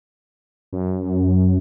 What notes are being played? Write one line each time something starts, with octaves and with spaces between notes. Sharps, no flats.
F#2